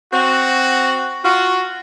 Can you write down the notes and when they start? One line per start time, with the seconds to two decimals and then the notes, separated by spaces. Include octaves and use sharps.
0.13 C4 F#4
1.25 F4 F#4